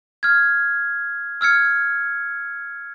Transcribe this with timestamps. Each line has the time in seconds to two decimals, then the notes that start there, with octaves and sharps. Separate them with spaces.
0.23 F6 G#6
1.41 E6 F6 G#6 C#7